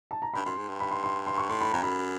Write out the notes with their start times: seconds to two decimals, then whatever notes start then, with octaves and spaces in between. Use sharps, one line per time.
0.11 A5
0.22 A#5
0.33 G2 B5
0.45 F#2 C6
0.57 G#2
0.69 G2
0.80 B5
0.91 C6
1.04 C6
1.27 C6
1.38 C#6
1.49 A2 C6
1.61 B5
1.72 F2 A#5
1.83 F#2 B5